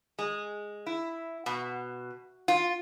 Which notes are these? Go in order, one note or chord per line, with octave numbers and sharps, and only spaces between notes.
G#3
E4
B2
F4